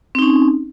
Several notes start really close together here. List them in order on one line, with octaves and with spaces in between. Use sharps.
C4 D#4 C#4